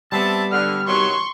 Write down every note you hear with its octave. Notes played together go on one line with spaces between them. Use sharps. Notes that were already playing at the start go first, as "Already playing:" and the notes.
G3 B3 C4 E5 A5
D3 F6
C3 D#3 F#3 C6 C#6